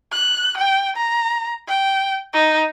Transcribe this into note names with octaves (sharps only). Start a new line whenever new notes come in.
F#6
G5
A#5
G5
D#4